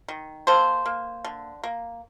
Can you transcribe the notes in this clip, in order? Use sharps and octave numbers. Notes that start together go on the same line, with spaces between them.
D#3
A#3 A4 C5
A#3
D3
A#3